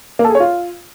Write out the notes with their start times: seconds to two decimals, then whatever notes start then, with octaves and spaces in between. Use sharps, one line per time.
0.19 A#3
0.24 A4
0.30 G#4
0.35 C#5
0.40 F4